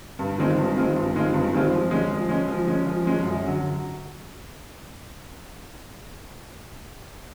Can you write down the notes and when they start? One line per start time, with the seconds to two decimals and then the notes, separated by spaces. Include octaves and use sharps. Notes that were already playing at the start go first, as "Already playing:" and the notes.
0.19 G2
0.38 D#3 G#3 C4 F4
0.58 G2
0.77 D#3 G#3 C4 F4
0.96 G2
1.15 D#3 G#3 C4 F4
1.34 G2
1.53 D#3 G#3 C4 F4
1.72 F3
1.91 G#3 C#4
2.10 F3
2.29 G#3 C#4
2.48 F3
2.67 G#3 C#4
2.86 F3
3.05 G#3 C#4
3.24 F#2
3.43 D3
3.48 F#3